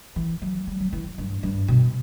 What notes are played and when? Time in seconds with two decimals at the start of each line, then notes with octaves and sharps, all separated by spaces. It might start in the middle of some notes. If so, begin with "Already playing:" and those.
0.16 E3
0.42 F#3
0.67 G3
0.80 F#3
0.93 E3
1.18 G2
1.43 G2
1.68 B2